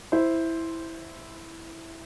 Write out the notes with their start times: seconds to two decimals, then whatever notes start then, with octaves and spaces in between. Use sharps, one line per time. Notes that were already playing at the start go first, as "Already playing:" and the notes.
0.12 E4 C5